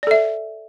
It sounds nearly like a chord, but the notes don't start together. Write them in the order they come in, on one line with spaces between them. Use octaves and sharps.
D5 A4 E5